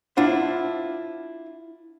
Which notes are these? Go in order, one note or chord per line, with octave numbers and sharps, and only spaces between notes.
D4 E4 F4 C5 F#5